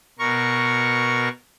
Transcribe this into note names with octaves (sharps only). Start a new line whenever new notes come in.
B2 A#4 C#6